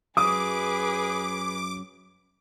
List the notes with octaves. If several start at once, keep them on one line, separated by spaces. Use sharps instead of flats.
F#2 F#3 G#4 B4 D6 D#6